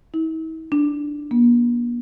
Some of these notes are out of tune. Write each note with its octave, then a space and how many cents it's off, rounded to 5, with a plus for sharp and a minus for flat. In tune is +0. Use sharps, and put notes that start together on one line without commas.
E4 -45
D4 +0
A#3 +45